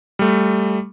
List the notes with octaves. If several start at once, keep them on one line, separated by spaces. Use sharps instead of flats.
G3 A3